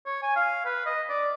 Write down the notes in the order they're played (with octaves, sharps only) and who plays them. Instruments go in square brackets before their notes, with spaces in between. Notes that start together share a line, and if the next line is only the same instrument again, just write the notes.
[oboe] C#5
G#5
F5
B4
D#5
D5